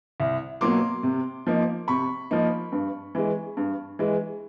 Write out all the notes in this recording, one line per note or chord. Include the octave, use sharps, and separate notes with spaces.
C2
B2 F#3 A#3 C6 D6
C3
F3 A#3 D#4
C3 B5 C#6
F3 A#3 D#4
G2
E3 G#3
G2
E3 G#3